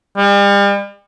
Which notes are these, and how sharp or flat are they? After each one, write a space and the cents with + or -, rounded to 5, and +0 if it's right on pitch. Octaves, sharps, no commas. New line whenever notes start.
G3 +40